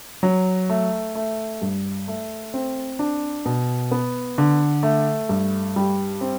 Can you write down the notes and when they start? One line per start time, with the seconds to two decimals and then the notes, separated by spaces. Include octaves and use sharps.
0.23 F#3
0.70 A3
1.15 A3
1.62 G2
2.08 A3
2.54 C4
2.99 D4
3.45 B2
3.91 B3
4.38 D3
4.83 A3
5.29 G2
5.76 G3
6.21 C4